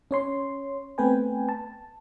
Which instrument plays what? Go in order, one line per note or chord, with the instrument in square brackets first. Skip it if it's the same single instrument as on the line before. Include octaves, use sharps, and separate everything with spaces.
[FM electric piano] C#4 C#5 C6
A3 B3 C4 B4 G5 G#5
A5